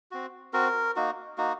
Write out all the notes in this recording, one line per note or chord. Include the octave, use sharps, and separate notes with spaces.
C4 F#4
C4 F#4 A#4
A#3 D#4 F#4
A#3 D#4 F#4